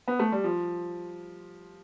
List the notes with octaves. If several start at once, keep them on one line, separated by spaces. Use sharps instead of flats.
B3
A3
G3
F3